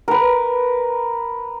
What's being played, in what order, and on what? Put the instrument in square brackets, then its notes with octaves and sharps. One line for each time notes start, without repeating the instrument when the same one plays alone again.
[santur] A#4 B4